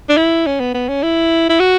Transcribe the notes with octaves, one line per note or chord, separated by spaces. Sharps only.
D4
E4
C#4
B3
B3
C#4
E4
E4
F#4